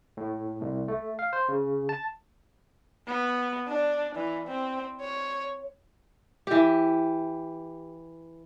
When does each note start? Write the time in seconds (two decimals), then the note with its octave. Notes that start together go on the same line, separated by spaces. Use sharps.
0.17 A2
0.61 C2
0.88 A3
1.19 F5
1.33 C5
1.48 C#3
1.89 A5
3.07 B3
3.68 D4
4.15 E3
4.48 C4
5.01 C#5
6.47 E3 G4